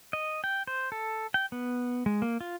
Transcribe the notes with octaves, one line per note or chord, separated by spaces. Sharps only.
D#5
G5
C5
A4
G5
B3
G#3
A#3
F4